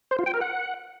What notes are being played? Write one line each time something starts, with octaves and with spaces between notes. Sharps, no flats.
C5
F4
G5
A#4
F#5